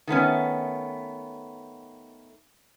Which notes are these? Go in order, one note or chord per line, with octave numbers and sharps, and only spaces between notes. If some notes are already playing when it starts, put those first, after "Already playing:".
D#3 A3 B3 C#4